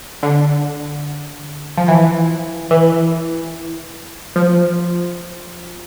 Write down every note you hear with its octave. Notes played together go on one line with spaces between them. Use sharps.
D3
F3
E3
E3
F3